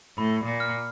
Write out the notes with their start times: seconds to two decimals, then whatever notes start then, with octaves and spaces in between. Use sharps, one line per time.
0.18 A2 B5
0.46 A#2
0.60 F6